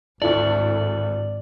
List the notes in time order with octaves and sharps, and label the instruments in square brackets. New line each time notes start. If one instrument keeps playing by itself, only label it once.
[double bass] G#1 [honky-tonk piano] D2 E4 A4 [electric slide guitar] D5